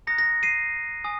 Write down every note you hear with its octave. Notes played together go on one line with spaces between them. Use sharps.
A#5 D#6 F#6 A#6 C#7
A#6
C7 D#7
G#5 D#6